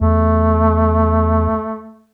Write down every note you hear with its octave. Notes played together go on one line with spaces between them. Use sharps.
E2 A3